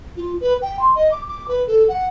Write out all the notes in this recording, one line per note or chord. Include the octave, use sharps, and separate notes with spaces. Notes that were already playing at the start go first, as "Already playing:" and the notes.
F4
B4
G5
C6
D#5
D6
D6
B4
A4
F#5